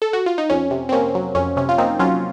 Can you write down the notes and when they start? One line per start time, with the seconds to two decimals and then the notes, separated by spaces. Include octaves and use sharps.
0.02 A4
0.13 F#4
0.26 F4
0.38 D#4
0.50 F2 C#4
0.71 C3
0.89 C4
0.92 A#3 C#4
1.15 F#3
1.35 F2 C#4
1.56 C3 C#4
1.69 F4
1.78 A#3 C4 D#4
1.99 F#3 C#4 F4